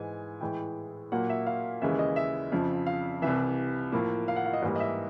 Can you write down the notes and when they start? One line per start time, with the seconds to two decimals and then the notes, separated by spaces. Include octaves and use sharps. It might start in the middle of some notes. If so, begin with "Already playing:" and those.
Already playing: G#2 E3 G#3 G#5
0.40 A2 E3 G#3 G5
1.12 A#2 F#3 A#3 F#5
1.29 E5
1.47 F5
1.81 D#2 C#3 E3 G#3 E5
1.99 D#5
2.16 E5
2.52 F2 C#3 F3
2.86 F5
3.22 C2 C3 E3 E5
3.92 A2 F3 A#3
4.28 F5
4.36 F#5
4.46 F5
4.53 D#5
4.62 G#2 E3 G3 A#3
4.76 D#5
4.80 E5